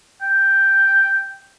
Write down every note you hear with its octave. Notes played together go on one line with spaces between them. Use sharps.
G5